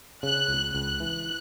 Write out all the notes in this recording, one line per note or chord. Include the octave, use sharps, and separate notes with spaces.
C#3 F#6
C#2
C#2 F#6
E3